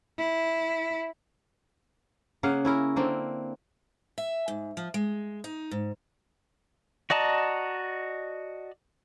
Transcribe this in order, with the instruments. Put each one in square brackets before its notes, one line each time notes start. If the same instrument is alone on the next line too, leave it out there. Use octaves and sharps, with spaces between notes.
[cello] E4
[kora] C#3 A#3 F5 F#5
C#4 E4 A#4
D3 A#3 C4
[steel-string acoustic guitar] E5
G#2
F3
G#3
D#4
G#2
[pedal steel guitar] F#4 D5 D#5 A5 A#5